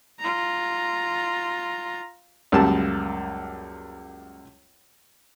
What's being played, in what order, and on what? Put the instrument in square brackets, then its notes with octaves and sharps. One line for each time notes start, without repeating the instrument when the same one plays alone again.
[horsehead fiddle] F4 A#5
[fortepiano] C#2 F#2 G3 A#3 A5